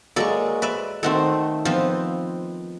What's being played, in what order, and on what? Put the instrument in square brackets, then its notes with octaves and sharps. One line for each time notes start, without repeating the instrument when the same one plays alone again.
[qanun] F#3 G#3 C#6 [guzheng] A#3 A4 D5
[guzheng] B4 D5 E5
[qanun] D#3 A3 C5 [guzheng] C4 F#4 A4
[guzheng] F3 [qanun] B3 C4